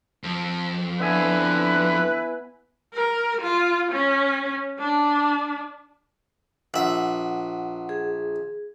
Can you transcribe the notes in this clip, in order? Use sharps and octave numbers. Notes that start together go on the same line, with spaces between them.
F2
D3 B3 E4 B4 E5 G#5
A#4
F4
C#4
D4
A#1 E5 F#5
G#4